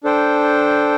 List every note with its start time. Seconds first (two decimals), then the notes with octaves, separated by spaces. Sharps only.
0.03 D4 A4 C5 G5